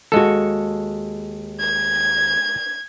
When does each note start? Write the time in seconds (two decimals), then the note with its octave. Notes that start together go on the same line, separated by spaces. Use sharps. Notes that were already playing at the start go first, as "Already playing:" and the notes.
0.12 D#2 G#3 F#4 A4
1.60 G#6